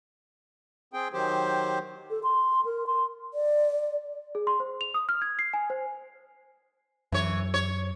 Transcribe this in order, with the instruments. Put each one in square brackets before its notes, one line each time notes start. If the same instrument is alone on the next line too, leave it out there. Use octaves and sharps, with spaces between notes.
[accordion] C4 G#4 G5
D#3 F#3 G4 C5
[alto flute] A4
C6
A#4
C6
[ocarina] D5
[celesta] G#4
C6
C5
F7
D#6
F6
G#6
C7
G#5
C5
[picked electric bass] F#2 [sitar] E3 C#5
[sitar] C#5